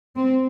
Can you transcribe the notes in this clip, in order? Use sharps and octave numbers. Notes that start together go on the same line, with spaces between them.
C4